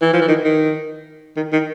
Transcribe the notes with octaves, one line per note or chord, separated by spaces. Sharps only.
E3
F3
E3
D#3
D#3
D#3
D#3